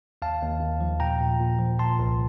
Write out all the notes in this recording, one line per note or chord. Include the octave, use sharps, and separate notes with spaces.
D#2 F5 A5
D#2
D#2
F3
A#2 G5 A#5
A#2
A#2
F3
A#2 A5 C6
C2